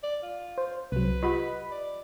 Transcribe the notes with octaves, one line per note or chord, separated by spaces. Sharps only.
D5
F4
C5
C2 F#3 B4
F4 G4 D#5 F#5 B5
D5